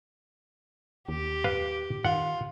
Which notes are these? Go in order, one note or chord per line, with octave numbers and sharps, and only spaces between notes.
D#2 G4
B4 F5
D#3 F4 F#5